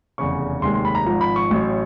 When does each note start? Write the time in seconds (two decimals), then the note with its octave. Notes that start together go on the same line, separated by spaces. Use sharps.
0.18 F1 E2 C#3 C#6
0.62 F1 D#2 D#3 G#3 C6
0.74 C6
0.85 B5
0.95 A#5
1.06 G#1 G#2 F3 A#5
1.21 B5
1.36 C#6
1.51 A1 A2 F#3